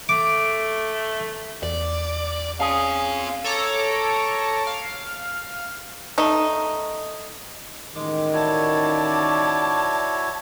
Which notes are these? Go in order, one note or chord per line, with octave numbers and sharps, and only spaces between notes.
A3 D6
E2 D5
C4 C#4 G#4 F5
A4 C#5 A#5 D6
F5
A3 D#4
A1 D#3 G#3 D6
E4 F#4 C#5 D5 A5